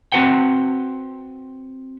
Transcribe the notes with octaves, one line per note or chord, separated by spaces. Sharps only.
C4 F#4 B4 F#5 G5